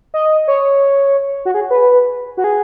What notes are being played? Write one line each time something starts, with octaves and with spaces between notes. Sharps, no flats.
D#5
C#5
F#4
G#4
B4
F#4
G#4